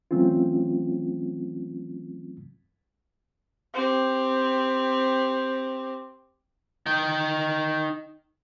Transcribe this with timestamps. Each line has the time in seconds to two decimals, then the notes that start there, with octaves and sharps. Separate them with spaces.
0.11 E3 F#3 A3 C4 C#4 F4
3.74 C4 G4
6.86 D#4 G5